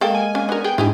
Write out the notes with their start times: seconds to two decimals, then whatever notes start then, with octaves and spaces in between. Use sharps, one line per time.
0.01 G#3 A#3 G#4 A4 G5
0.15 G#5
0.35 A#3 C#4
0.49 B3 D4 A#4
0.64 G#4 G5
0.78 G#2 D4 E4 G4 G#4 G#5